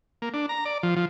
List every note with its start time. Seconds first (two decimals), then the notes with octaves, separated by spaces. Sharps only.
0.22 A#3
0.34 D4
0.49 A#5
0.65 D5
0.83 F3
0.96 F3